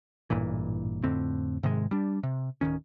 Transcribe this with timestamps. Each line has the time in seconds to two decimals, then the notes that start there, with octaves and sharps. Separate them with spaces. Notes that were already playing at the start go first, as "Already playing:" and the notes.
0.30 A1 G2 A#2 E3
1.03 F2 A2 D3 C4
1.63 G#2 C3 D#3 G#3
1.91 G3 D4
2.23 C3
2.61 D1 C#2 D#3 C#4